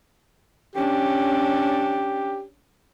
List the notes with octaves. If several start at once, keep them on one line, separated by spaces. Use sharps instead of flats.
C#4 D4 G4